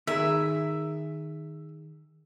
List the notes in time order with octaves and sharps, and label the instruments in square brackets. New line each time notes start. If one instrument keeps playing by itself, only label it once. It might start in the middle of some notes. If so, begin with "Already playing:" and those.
[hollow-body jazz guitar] D#3 G#4 A#4 [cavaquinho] E5